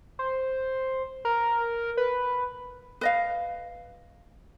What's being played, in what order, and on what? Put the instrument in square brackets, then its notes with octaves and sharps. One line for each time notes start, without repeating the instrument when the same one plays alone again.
[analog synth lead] C5
A#4
B4
[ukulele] B4 D#5 F5